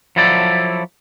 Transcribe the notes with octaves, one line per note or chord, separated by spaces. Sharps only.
F3 F#3 E4 A4 D5